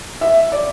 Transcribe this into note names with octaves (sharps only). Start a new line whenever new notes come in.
E5
D5